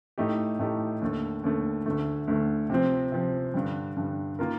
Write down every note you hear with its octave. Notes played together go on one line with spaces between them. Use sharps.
A2 A3 D#4 G4
A2 A3 D#4 G4
D#2 D3 A3
D#2 D3 A3
D2 D3 A3
D2 D3 A3
C3 F3 C4
C3 F3 C4
G2 D3 G3
G2 D3 G3
D#3 A#3 F4 A#4